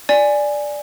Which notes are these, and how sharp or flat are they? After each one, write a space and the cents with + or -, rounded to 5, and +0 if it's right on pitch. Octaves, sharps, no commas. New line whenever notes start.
D5 +0 G#5 +0